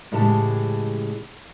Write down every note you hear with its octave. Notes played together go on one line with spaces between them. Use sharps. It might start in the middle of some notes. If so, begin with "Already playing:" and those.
A2 C#3 E3 G#3 G4 A5